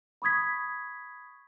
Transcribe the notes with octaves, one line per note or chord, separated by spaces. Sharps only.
B5 C#6 D#6 G#6 B6